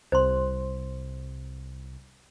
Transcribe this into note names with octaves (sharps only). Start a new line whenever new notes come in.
C2 C5 C6